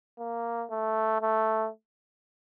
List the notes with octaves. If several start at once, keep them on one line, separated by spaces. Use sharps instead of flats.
A#3
A3
A3